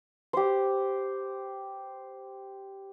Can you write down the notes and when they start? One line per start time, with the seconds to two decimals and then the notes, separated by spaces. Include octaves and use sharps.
0.33 G4 C5